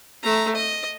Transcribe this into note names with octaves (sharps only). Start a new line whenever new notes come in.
A3 A#5
D#5